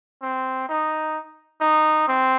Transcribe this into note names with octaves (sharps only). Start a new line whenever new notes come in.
C4
D#4
D#4
C4